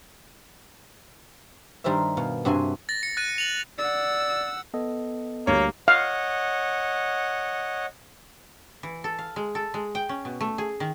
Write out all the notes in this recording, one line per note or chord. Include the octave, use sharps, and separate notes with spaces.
G2 D#3 G3 A#4 C5 E5
B2 F5
G2 C3 F#4 E5 G#5 C6
A6 A#6
C#7
F#6 A6 D#7
F7 F#7
D5 F#5 E6
B3 A4 D#5
D2 G3 A#3 G4 C#5
C#5 D#5 F5 F#5
E3
A4
F5
G#3
A4
G#3
G5
C#4
B2
A3
G#4
D#3